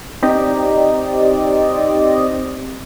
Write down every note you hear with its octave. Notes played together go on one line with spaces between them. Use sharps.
C4 D#4 G4 D5 D#5